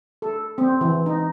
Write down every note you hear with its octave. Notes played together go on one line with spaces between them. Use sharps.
A4
C4
E3
D#4